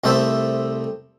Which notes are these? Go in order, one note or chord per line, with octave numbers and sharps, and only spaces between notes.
C2 A3 A4 C5 E5